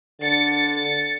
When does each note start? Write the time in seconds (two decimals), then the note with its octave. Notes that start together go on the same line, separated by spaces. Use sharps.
0.21 D3 A6 C#7